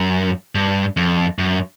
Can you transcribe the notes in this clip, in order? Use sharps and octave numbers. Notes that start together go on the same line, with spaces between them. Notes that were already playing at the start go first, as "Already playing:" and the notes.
Already playing: F#2
G2
F2
F#2